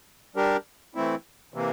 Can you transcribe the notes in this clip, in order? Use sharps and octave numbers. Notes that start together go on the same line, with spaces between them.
G3 D4 G4 A#4
E3 A3 C4 E4
C3 E3 A#3